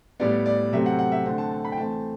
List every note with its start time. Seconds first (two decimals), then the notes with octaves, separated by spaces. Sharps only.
0.20 A2 G3 B3 D5
0.46 D5
0.72 C3 F#3 A3 C4 E5
0.86 F#5
0.99 F#5
1.12 E5
1.25 D3 A3 C4 F#5
1.38 A5
1.52 A5
1.65 B5
1.72 G5
1.78 E3 A3 C4 A5